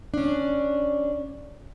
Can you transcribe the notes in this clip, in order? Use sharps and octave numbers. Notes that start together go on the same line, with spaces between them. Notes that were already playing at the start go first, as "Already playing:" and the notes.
C#4 D4